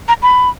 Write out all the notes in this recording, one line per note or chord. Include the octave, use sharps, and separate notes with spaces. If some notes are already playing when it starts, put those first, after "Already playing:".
A#5
B5